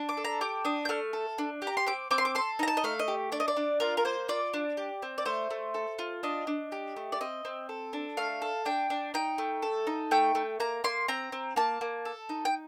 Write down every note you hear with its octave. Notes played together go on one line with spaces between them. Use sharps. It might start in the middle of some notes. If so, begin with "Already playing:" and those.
Already playing: D4
D6
A4
A#5
G4 D6
D4 D#6
G6
A3 F6
A4
D4
G4
A#5
C6
C4 D6
C4 D6
C6
D6
A4 C6
D#4 A#5
A5
D#5
A3 F5
D#5
G4
D4 D5
D#5
D5
D4
F4 A#4
A#4
A#3 C5
F4 D5
D4
G4
C4
D5
A3 C5
A3
A4
F4
D4 D#5
D4
G4
A3
D5
C4 D#5
C4
A4
D4
A3 F5
A4
D4 G5
D4
D#4 G5
A3
A4
D#4
A3 G5
A3
A#3 A#5
A#3 C6
C4 A#5
C4
A#3 A5
A#3
A4
D#4
G5